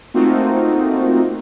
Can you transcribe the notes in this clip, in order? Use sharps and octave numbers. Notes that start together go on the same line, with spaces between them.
A3 A#3 C4 D#4 F4 F#4